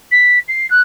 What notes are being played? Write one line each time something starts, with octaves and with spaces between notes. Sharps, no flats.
B6
C7
F#6